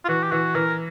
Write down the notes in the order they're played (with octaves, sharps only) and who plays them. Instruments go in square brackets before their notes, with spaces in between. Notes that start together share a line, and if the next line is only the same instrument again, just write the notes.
[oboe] F4
[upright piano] E3 [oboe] F#4
[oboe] G4
[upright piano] E3 [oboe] F#4
[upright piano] E3 [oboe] A#4